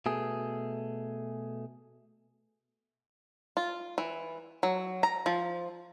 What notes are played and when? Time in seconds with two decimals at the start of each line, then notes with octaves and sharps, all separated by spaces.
0.06 B2 A3 G#4
3.57 F4
3.98 E3
4.63 F#3
5.03 A#5
5.26 F3